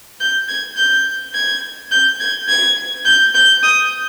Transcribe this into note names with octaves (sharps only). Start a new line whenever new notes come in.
G6
G#6
G6
G#6
G6
G#6
G#6
G6
G6
D#6